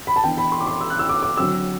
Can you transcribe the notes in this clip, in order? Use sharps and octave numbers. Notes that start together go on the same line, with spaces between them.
B5
A5
E3 B3 D4 G5
B5
C6
D6
C6
E6
F#6
E6
D6
D6
D3 F#3 C4 E6